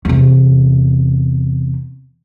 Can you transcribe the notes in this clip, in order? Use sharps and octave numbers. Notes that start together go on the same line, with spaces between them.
E2 C3